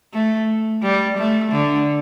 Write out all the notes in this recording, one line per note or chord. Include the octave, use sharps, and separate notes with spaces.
A3
G3
A3
D3